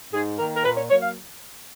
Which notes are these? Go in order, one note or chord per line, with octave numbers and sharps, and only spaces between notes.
G#2 G#4
D#3 A#3 A#4
A#4
A#2 B4
C#5
F#3 A#3 C#5
F5